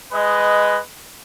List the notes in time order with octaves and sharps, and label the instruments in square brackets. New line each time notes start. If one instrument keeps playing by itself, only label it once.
[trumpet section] G#3 B4 D#5